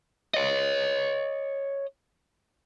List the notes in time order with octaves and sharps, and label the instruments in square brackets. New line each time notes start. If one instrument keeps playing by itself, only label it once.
[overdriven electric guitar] C#5 D#5